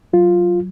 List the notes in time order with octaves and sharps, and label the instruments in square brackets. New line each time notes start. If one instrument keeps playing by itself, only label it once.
[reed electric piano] F#3 F4